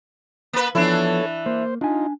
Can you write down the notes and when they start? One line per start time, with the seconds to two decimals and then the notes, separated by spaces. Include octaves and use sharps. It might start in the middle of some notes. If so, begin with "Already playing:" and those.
0.53 A#3 B4
0.75 E3 F3 B3 D4 E4 A4 C#5
1.46 A#3 C5
1.81 D4 D#4 F4 G#5